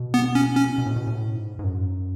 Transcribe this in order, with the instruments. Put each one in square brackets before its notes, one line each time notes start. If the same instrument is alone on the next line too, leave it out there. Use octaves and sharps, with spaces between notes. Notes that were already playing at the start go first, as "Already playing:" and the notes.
Already playing: [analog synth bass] B2
[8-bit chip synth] B3
C#4
C#4
[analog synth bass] B2
A2
B2
A2
G#2
G#2
F#2